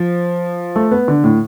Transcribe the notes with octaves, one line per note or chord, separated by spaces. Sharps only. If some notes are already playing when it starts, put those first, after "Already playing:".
Already playing: F3
A3
B3
D3
A2